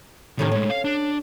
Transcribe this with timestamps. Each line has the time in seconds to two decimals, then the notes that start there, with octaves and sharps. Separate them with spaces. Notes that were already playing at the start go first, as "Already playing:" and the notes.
0.39 A2 C3 D#3 C#4
0.52 A2 G#3 C#4
0.70 F5
0.85 D4